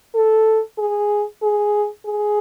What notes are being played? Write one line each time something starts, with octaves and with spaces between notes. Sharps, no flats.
A4
G#4
G#4
G#4